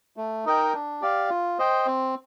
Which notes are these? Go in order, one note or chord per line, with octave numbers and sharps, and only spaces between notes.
A3
D#4 A#4 D#5 G5
D4
G4 D5 F5
F4
C5 D#5 G5
C4